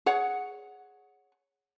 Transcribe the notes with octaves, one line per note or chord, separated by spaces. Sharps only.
G#4 C#5 F#5